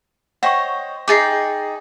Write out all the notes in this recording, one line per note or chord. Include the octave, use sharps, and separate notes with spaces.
C5 C#5 D#5 F#5 G5 C#6
D#4 G#4 G5 D6 A6 C7